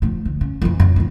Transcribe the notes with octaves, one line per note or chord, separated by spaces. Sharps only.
F3 A3
D2
C#4
F2 E3
F#2
E1 F2